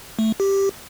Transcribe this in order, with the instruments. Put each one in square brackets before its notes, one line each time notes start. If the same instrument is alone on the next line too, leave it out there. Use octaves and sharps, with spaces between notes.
[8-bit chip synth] A3
G4